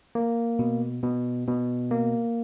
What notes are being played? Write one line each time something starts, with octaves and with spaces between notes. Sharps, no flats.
A#3
B2
B2
B2
A#3